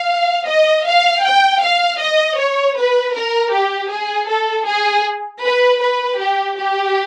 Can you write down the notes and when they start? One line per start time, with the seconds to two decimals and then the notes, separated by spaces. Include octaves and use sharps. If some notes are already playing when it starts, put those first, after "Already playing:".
Already playing: F5
0.48 D#5
0.87 F5
1.25 G5
1.63 F5
2.01 D#5
2.39 C#5
2.78 B4
3.15 A#4
3.53 G4
3.91 G#4
4.30 A4
4.67 G#4
5.44 B4
5.82 B4
6.20 G4
6.59 G4